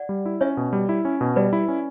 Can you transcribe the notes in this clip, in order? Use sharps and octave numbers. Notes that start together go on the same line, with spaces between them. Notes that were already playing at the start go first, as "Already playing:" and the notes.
Already playing: D5 F#5
G3
E4
C#4 C#5 E5
B2
G3
E4
C#4
B2
G3 B4 D5
E4
C#4